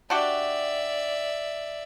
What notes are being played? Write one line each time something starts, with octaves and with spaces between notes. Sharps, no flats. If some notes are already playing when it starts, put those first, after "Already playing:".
D4 F#4 G4 D5 E5